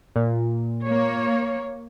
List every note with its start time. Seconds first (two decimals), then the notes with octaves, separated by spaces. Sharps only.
0.16 A#2
0.85 A#3 C#5